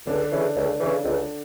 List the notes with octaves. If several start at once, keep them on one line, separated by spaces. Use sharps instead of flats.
C#2 D3 D4
C#3 E3
C#2
C#3 E3
C#2